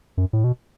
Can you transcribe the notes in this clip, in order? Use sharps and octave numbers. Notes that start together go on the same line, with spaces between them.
F#2
A2
B2